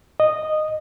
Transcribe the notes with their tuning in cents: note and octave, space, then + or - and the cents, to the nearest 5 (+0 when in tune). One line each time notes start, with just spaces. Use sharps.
D#5 -10